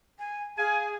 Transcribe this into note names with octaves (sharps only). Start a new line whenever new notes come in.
G#5
G#4 F5 G#5